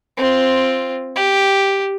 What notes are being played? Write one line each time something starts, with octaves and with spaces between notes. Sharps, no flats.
C4 F4
G4